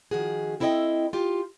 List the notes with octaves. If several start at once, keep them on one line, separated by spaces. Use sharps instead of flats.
D#3 F3 F#4 G#4
C4 E4 A4 A#4 D#5 G5
F4 G4